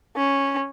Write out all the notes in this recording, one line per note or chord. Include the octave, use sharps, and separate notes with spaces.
C#4